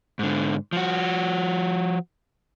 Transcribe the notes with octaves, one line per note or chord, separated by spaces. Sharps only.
G#2 D3
F3 F#4